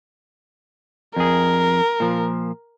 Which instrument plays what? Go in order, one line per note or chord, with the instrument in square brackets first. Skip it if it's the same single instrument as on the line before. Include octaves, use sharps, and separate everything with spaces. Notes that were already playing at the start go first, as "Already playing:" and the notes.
[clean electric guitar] F2 G#4 [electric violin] A#4
[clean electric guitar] A#2 F3